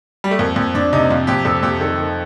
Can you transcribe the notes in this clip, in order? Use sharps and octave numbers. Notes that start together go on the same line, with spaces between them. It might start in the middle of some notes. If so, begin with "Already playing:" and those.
G3
A3
F2 A#3
F2
F2 D4
C3 D#4
F2 F4
F2 G4
F2 A4
F2 G4
D#3 A4
D#3